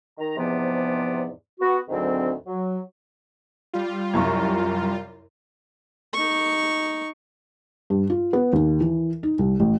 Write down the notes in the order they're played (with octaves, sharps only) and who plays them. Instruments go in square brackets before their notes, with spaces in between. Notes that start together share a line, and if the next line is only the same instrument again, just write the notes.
[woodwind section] D#3 A#5
E2 G#2 C3 F3 B3 D5
B3 F#4
D2 G#2 D#3 F#3 C4
F#3
[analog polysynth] G3 F4
[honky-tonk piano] C2 F#2 C#6
[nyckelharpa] D#4 C#6
[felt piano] G2
F4
B3
D#2
E3
D#4
C2
A1